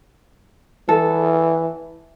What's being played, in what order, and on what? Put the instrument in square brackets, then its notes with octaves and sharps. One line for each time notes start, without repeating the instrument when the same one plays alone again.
[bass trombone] E3 [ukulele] A4